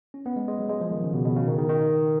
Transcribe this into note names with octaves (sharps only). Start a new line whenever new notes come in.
C#4
B3
G#3
G#3
F#3
G#3
F3
D#3
C#3
B2
B2
C#3
D#3
D#3
D#3